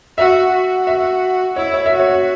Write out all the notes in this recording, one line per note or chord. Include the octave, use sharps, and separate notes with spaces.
F#4 E5
F#4
E5
E4 C#5
C#5
E5
F#4
C#5